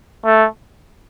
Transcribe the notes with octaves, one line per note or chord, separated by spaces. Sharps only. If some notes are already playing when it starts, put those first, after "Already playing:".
A3